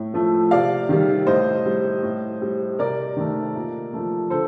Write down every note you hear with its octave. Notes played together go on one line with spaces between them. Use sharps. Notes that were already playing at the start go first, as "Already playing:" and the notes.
Already playing: A2
F3 A3
C3 D5 F5
D#3 G3
A2 C5 D#5
G3
A2
G3
C3 A#4 D5
D#3 A3
A#2
F3 A3
D3 A4 C5